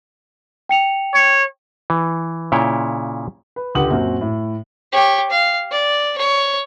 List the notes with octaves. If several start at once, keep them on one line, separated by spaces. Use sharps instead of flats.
G5 C#7 F7
C#5
E3
A#2 C#3 E4 C#5 G5
B4
C#2 D3 G4 F#5 D#6 F#7
F#2 A#2 C4 F#4
A2
G4 C#5
F5
D5
C#5